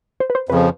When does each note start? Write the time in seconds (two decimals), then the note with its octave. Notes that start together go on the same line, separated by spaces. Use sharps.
0.20 C5
0.30 B4
0.35 C5
0.49 F2 C#3 F3 B4